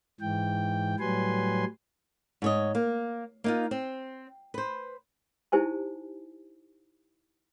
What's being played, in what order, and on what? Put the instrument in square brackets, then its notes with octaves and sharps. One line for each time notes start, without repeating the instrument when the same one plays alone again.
[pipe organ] G#2 E3 G5
A2 F#3 G3 B4 G#5 C6
[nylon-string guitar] G#2 C#5 D#5
A#3
A#3 D#4 F4
C4
B4 C5
[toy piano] D#4 E4 G4 C5 G#5 A5